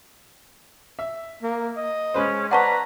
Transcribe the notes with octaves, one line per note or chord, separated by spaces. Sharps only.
E5
A#3
D#5
G#3 C#4 B4 C5
B4 C5 D5 F#5 A5 A#5 C#6